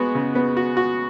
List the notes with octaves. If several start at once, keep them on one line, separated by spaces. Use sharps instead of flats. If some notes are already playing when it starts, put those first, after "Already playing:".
Already playing: G#3 B3 F#4
C#3
B3
F#4
F#4